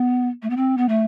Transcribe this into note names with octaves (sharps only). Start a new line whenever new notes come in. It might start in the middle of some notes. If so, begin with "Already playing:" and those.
Already playing: B3
A3
B3
C4
B3
A3